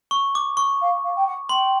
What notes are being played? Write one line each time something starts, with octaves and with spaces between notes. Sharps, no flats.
C#6
D6
C#6
F5
F5
G5
F#5
G5 C6